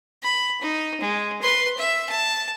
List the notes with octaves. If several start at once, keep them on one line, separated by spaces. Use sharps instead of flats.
B5
D#4
G#3
B4 C6
E5
A5